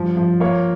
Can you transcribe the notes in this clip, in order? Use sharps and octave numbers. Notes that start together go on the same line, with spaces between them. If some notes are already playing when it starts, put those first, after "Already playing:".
Already playing: G2 F3
F3
A#3 C#5 F5